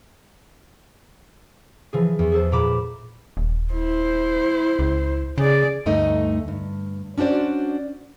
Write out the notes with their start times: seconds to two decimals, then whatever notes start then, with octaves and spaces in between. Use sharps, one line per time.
1.93 E3 F3 G#4
2.19 E2
2.32 G#4 A4 C5
2.52 A#2 A#5 B5 D6 E7
3.37 D#1
3.73 E4 C5
4.79 C#2
5.38 C#3 G#4 D5
5.86 D2 G2 A3 D#4 D#5
6.48 G2
7.18 C#4 D4 F#4 C5 D5